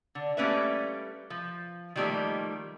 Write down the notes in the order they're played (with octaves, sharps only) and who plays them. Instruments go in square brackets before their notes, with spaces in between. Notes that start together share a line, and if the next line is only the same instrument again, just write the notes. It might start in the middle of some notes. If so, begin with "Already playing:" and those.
[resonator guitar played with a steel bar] D3
G3 A3 A#3 C#4 B4 E5
F3
D#3 F3 G3 A3 A#3 D#4